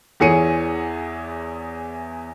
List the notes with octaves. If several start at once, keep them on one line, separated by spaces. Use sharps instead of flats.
E2 E3 G#4 C#5 C#7 D#7